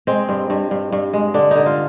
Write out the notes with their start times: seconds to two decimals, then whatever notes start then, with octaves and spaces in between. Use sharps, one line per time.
0.07 G#3 C4
0.29 G2
0.50 G2
0.71 G2
0.92 G2
1.13 G#3
1.34 D3 D4
1.51 D3 D#4
1.66 F4